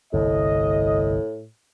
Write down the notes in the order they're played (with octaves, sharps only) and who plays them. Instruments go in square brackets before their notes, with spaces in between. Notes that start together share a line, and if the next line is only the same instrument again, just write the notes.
[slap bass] G1 C2 [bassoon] A2 [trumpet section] D#5